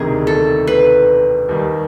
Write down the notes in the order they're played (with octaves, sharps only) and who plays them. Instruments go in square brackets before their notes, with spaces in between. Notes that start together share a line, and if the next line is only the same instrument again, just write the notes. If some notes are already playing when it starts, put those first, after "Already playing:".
Already playing: [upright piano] E1 D2 C3 D#3 [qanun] G#4
[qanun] A4
B4
[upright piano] D#2 D#3 G3